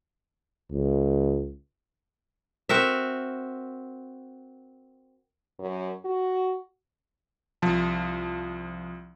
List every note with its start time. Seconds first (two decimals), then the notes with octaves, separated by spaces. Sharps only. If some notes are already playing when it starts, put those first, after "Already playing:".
0.72 C#2
2.69 C4 F#4 A#4 E5
5.59 F#2
6.05 F#4
7.62 C2 F3 A5